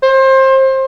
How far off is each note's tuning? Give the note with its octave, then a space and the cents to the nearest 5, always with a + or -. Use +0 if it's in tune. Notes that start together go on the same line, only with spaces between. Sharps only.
C5 +25